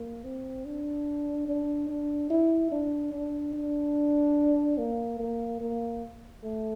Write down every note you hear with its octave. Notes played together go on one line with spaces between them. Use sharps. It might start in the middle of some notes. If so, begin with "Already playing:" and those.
Already playing: A#3
C4
D4
D4
D4
E4
D4
D4
D4
A#3
A#3
A#3
A3